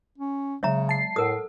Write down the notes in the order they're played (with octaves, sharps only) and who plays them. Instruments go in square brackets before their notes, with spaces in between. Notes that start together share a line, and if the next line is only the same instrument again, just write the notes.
[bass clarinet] C#4
[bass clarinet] C#3 [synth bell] F#3 G#3 [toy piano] C#5 E5 A#5
[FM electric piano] A5 C7
[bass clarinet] A2 [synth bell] A4 F#5 [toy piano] A#4 D#6